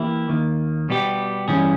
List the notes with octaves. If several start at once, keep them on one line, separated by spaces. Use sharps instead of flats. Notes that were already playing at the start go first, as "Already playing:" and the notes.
Already playing: E3 A#3 E4 G4
D#2 D#3 A#3
B2 G3 B3 E4 G4
G2 E3 G3 C#4 G#4